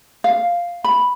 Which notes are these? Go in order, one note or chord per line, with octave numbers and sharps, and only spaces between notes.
F5
B5